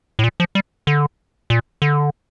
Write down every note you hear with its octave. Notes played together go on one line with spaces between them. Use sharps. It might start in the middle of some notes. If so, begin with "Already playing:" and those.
A2
A#2
F3
G3
D3
A#2
D3